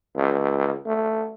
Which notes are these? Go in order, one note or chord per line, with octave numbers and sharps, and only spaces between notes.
C#2
A3